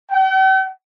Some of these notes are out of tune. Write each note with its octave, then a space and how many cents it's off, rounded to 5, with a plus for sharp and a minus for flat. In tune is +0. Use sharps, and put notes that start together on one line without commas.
G5 -45